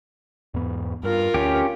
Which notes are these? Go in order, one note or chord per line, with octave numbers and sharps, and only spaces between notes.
E2 G#2 B3
G2 F4 A#4
D2 C#4 G4